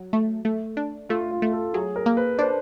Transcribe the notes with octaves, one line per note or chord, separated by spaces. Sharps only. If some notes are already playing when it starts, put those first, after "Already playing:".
Already playing: F#3
A3
A3
D4
A3 F4
F4
A3
A4
F#3 G#4
A#4
A#3
B4
D4 C5